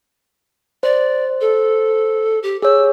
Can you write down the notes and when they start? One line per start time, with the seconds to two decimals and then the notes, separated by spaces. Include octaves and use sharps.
0.83 C5 D5
1.41 A4
2.43 G4
2.62 G#4 C#5 E6